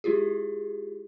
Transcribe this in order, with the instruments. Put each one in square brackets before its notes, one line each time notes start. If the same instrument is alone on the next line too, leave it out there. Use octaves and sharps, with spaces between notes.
[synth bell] G#3 E4 F4 G4 G#4